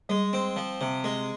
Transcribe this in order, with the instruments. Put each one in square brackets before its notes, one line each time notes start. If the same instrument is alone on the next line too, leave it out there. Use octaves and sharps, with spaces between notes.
[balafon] G3 [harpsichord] G#3
[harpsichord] C4
F3
C3
G#3